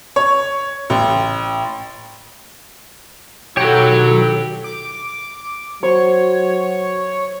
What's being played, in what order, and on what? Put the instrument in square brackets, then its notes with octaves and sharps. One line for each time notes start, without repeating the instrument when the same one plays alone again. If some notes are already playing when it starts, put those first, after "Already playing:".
[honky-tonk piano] C#5
A1
[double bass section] B2 D#3 F#3 [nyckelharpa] E4 A4 [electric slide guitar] F#4 C#5 [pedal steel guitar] G4
[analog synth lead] D6
[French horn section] F#3 F#4 [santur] C5 [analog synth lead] C#5